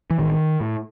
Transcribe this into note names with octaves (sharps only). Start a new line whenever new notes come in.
E3
A1 D#3
A2